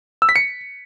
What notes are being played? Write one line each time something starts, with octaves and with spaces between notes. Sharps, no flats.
E6
B6
C#7